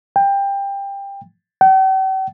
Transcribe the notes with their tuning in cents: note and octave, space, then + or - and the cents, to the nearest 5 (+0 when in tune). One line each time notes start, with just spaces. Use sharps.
G5 +20
G5 -45